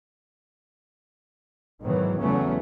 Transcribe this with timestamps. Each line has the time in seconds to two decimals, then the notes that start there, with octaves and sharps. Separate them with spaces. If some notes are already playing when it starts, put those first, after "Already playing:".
1.82 G#2 B2 D#3 E3 F#3
2.20 E2 C#3 F#3 A3 B3 C#4